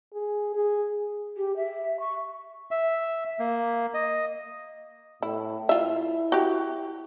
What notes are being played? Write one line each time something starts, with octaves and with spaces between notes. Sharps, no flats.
G#4
G#4
G4
E5
C#6
E5
A#3
D#5
A2 E4
E4 F4 E5
F#4 G4